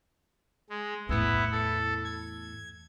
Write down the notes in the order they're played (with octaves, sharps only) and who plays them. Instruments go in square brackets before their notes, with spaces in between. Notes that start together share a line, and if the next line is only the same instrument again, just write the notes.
[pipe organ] G#3
[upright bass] E2 A2 [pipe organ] B3 E4
[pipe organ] A4
G#6